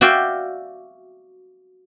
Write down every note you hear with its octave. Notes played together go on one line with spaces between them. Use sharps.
F#4 D5 E5 F5 G5